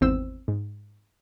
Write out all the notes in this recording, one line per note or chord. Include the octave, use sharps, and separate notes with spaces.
G#1 E2 C4 C5 E6
G#2